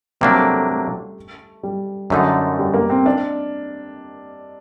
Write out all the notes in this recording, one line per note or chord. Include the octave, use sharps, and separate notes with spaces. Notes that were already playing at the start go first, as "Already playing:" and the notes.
C3 F#3 G3 A#3 D4
A3
A3
A3
G3
F#2 D3 A3 D#4
G3
A#3
C4
D4